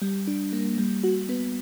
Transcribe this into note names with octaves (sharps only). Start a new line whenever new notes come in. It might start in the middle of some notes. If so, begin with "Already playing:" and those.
G3
D4
A#3
G3
F#4
B3